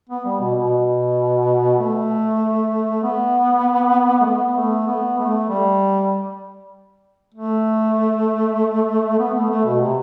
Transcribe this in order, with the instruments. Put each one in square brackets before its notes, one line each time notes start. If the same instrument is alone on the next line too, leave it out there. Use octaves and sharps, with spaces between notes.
[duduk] B3
G3
B2
B2
A3
B3
A3
B3
A3
B3
A3
G3
A3
B3
A3
A3
B2
C3